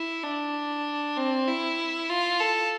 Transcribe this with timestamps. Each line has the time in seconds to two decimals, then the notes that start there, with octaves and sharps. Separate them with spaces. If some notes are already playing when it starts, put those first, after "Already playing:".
Already playing: E4
0.23 D4
1.16 C4
1.47 E4
2.09 F4
2.40 A4